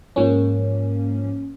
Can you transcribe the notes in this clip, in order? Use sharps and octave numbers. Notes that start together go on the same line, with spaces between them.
G#2 F3 A#3 C#4